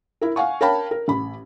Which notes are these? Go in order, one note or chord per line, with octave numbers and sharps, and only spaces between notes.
E4 A#4
F5 F#5 G#5 C#6
A#4 C#5 F5 G5 A5 B5
A#4
A1 B5